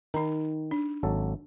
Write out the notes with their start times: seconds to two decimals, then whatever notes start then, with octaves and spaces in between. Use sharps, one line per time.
0.14 D#3 D#4 A#5
0.71 D4
1.03 G#1 F#3 A4